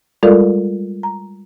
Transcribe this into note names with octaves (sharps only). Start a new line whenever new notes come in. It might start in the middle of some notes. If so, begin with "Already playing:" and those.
G3 G#3 F4 A4 A#4 D5
A#5